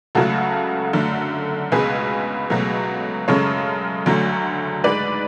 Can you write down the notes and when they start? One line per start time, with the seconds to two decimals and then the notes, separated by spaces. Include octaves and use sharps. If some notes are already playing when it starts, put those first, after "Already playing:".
0.15 C#2 C#3 F#3 A3 F#4 A4
0.93 F#2 D3 A3
1.72 C#2 B2 G#3 G#4 B4
2.50 C#2 B2 F#3 A3
3.28 F#2 C#3 G#3 A4 C#5
4.06 D2 D3 F#3 A3
4.84 G#2 G#3 B4 D5